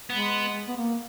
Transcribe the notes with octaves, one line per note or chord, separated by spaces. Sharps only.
G#3 B3
B3
A#3